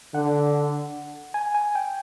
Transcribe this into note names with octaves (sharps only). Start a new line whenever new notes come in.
D3 F#5
G#5
G#5
G5